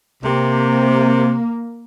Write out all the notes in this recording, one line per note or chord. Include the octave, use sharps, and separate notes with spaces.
C3 A#3